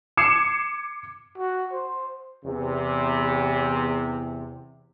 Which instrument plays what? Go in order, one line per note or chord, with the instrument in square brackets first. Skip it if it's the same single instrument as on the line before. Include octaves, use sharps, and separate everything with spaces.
[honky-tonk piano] D6 G#6 C7 C#7 E7
[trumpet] F#4
C5
[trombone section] E2 C3